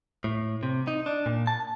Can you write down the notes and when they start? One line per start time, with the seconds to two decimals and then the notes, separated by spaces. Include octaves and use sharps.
0.24 A2
0.63 C3
0.87 D#4
1.06 D4
1.26 A#2
1.47 A5